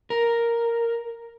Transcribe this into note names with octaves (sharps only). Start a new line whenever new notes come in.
A#4